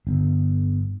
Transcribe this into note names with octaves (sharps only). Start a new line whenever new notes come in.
G1